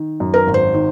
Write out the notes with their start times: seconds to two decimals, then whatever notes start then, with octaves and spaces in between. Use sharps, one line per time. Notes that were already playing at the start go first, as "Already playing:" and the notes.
Already playing: D#3
0.20 F#2
0.34 A#4
0.47 G#1
0.54 C5
0.74 D#3